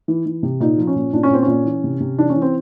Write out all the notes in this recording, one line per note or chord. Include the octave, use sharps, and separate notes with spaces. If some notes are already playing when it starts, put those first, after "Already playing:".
E3
E3
C3
A#2 D#4
F3
C#4
A#2
A#2 D4
C#4
A#2 C4
C#4
A#2
E3
C3
C3
E3 D4
C#4
E3
C4